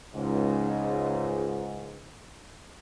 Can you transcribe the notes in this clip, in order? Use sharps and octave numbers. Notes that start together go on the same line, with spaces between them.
C#2 G#2